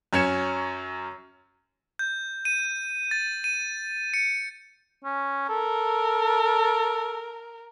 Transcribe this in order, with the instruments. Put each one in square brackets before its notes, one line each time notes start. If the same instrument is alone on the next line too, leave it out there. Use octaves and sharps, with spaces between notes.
[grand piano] F#2 C#4 G#6 C#7 E7
[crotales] G6
D#7
A6
D#7
C#7
[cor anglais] C#4
[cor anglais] A4 [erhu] A#4